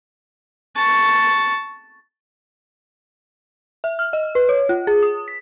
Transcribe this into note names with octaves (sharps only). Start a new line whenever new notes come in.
A5 C#6
E5
F6
D#5
B4
C#5
F4
G#4
D#6
B6